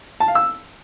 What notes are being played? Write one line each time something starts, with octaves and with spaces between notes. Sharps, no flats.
A5
F5
E6